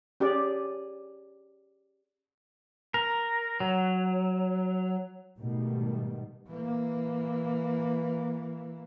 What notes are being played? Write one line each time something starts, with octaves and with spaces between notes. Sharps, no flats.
C#4 G4 G#4 D5
A#4
F#3
G#2 B2 D#3 G3 A3
E3 A#3